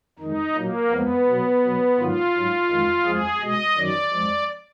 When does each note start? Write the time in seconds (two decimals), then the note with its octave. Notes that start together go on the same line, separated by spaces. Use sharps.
0.19 F2 D#3 G#3 D#4
0.55 A#2 F#3 A#3
0.90 F2 F3 G#3 B3
1.26 B2 F#3
1.62 B2 F#3
1.98 G#2 D#3 F#3 F4
2.34 G#2 F#3
2.70 F2 D#3 G#3
3.05 F2 F3 G#3 G#4
3.41 B2 G#3 D#5
3.76 F#2 D#3 F#3 D5
4.13 F2 F3 G#3